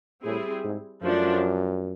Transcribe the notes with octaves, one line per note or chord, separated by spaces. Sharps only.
A2 G3 C4 E4 G#4
G#2
F#2 F3 A3 D4